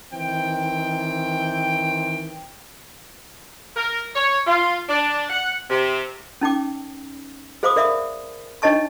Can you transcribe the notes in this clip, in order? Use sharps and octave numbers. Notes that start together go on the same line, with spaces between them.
D#3 E3 C4 G5
A#4
C#5
F4
D4
F#5
C3
C#4 D#4 G5 D6
G#4 C5 F5 B5 D6 D#6
A#4 D5 E5 F5 B5 D#6
D4 D#4 C#5 D#5 A5 C#6